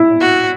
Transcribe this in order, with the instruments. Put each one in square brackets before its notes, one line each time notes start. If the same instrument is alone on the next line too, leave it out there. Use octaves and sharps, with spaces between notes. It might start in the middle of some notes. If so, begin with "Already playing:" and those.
Already playing: [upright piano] E4
[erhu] F#4